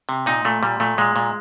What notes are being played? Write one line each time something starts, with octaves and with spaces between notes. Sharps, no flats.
C3
A#2 D#4
A#2 A3
A#2 G3
A#2 A3
A#2 G#3
A#2